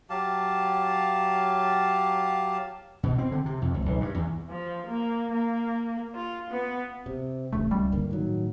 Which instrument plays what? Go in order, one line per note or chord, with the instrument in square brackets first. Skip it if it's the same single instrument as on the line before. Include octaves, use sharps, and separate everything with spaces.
[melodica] F#3 G4 F5 A5
[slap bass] B2
C4
D3
C3
F2
C#2
B1
G2
E2
[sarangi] F3
A#3
A#3
F4
B3
[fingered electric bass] C3
[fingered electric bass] E1 D2 C#3 [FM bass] A3
[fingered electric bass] C#2 [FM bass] G3
[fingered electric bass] G1 D3 A#3
A2 D#3 F#3